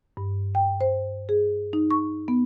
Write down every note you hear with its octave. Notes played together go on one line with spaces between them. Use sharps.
G2
G5
C5
G#4
D#4
C#6
B3